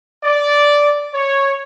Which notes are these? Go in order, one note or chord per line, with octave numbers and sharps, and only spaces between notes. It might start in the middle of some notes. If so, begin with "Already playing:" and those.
D5
C#5